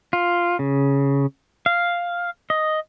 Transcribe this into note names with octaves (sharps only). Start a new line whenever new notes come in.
F4
C#3
F5
D#5